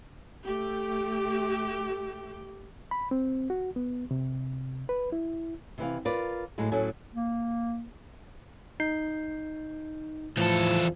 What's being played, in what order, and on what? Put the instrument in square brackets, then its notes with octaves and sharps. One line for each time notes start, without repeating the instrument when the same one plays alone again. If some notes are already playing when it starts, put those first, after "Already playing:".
[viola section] A3 G4
[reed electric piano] B5
C4
F#4
B3
C3
B4
E4
[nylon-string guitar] C3 E3 F5
F4 A#4 B4 D5
A2 F#3 G#3
A2 F#3 A3 C#4 G#5
[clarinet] A#3
[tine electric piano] D#4 G6 C7
[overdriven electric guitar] E2 A4 [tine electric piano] A2 [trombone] F3